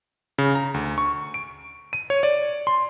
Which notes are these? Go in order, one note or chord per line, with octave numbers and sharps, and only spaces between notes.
C#3
A#5
D2
C#6
D7
D#7
C#5
D5
C6